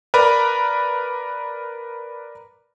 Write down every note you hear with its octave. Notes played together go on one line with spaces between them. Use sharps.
A#4 B4 D5 A#5 B5